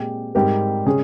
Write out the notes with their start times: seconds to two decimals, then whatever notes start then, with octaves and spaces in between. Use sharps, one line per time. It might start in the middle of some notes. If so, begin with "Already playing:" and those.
Already playing: A#2 G#3 C4 G4
0.35 G#2 G3 C4 G4 A#4
0.86 C#3 G#3 C#4 G#4